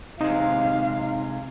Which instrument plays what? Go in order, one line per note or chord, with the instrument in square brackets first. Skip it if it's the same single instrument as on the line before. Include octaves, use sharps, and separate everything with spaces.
[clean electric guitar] C3 G#3 [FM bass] D#4 [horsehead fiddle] F5